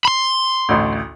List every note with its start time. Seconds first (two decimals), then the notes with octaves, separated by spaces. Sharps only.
0.05 B5 C6
0.69 A1 D2